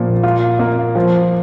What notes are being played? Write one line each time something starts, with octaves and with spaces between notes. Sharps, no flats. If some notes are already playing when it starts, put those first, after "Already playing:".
Already playing: A#2 F3
F4
A#3
F3